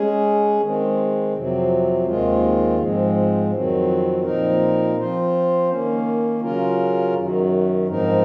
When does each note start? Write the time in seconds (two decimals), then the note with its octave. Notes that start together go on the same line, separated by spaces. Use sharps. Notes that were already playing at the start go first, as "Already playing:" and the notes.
Already playing: G#3 C#4 G#4
0.60 D#3 G#3 C4
1.34 F2 C3 F#3 C4
2.06 D#2 D#3 G#3 C4 F4
2.79 G#2 F3 G#3 C4
3.52 F2 D#3 F#3 C4
4.24 A#2 F3 C4 D#4 A#4
4.97 F3 C4 F4 C5
5.70 D#3 A#3 C#4
6.41 C#3 F#3 C#4 F4 A#4
7.14 F#2 D#3 F#3
7.87 G#2 F3 C4 D#4 A#4